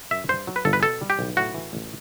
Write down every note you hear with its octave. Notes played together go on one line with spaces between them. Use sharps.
F#2 E5
G2 C5
F#3
B4
G1 A4
B4
B2 A4
G3
G4
B1
A2 F#4
E3
A1